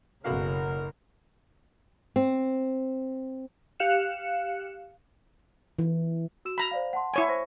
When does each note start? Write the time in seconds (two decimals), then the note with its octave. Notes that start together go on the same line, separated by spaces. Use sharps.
0.24 F#1 B1 C#3 F#4 A#4 F5
2.16 C4
3.80 G4 F5 F#6 C#7 E7
5.79 E3
6.45 F#4 E6 E7
6.58 A#5 B5
6.71 C5 D5 F5
6.93 F#5 A5 C6
7.14 E4 C#5 G#5
7.28 C5 C#6 A#6